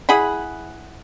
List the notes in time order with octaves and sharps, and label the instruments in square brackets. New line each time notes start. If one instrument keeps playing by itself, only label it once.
[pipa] E4 G#4 F#5 B5